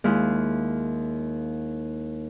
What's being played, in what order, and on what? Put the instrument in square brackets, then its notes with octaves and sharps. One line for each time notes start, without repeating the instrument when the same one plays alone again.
[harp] D#2 G#3 E4 F4 F5 C6